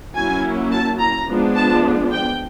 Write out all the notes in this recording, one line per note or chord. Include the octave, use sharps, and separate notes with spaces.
F#3 A#3 C#4 E4 G#5
A5
A#5
F3 G#3 B3 D4
A5
G5